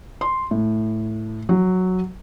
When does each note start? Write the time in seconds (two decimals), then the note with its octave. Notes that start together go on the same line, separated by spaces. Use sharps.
0.21 C6
0.51 A2
1.49 F#3